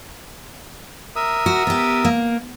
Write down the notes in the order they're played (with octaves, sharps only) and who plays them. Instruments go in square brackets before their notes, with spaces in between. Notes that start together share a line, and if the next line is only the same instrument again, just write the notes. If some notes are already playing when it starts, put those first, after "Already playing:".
[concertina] A#4 E5 D#6
[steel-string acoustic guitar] F#4
B3 G4
A#3